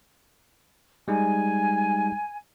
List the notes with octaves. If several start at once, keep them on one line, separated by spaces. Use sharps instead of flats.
G3 G#3 D#4 G#5